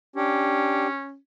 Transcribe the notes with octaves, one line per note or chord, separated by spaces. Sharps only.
C#4 D4 G4